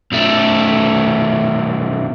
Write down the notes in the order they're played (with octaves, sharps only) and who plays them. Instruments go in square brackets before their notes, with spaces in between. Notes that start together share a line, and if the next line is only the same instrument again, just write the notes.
[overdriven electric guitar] B1 A3